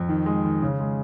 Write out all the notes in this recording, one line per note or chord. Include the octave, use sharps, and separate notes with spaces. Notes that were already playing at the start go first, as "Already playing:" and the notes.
Already playing: F2
D#3
G#3
D#3
C#3
G#3